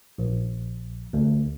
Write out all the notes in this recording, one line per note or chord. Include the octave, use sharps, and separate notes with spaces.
A#1
D2